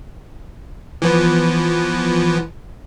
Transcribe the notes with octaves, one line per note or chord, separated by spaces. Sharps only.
E3 F3 B3